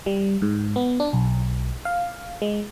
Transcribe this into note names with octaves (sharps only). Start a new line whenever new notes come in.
G3
G#2
B3
D4
B1
F5
G#3